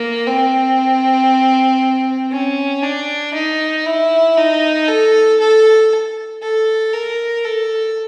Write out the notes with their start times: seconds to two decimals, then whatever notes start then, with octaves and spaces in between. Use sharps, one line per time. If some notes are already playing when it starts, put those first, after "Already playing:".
Already playing: A#3
0.27 C4
2.32 C#4
2.83 D4
3.34 D#4
3.86 E4
4.38 D#4
4.88 A4
5.40 A4
6.42 A4
6.94 A#4
7.45 A4